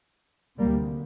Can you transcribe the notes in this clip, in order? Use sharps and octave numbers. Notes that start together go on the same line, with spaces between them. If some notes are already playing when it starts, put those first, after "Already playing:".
D2 C3 G3 A#3